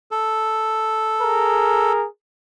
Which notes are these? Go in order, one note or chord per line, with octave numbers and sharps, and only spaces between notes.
A4
G#4 A#4